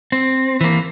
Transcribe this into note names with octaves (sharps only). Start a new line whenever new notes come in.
C4
E3 A#3